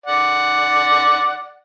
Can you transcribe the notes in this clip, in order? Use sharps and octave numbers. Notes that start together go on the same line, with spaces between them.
D5 F#5